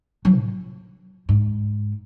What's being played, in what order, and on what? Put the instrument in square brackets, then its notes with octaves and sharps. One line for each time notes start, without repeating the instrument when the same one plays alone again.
[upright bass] F#3
A2
G#2